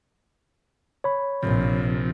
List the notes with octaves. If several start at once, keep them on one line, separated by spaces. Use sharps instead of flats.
C#5 B5
A#1 C3 F3